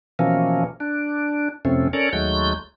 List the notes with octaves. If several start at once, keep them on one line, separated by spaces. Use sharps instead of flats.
B2 E3 F3 A#3 C#4
D4
F2 C3 A3 C4 C#4
C#4 A4 A#4 C#5 D5
D#2 F#3 G#3 A3 G6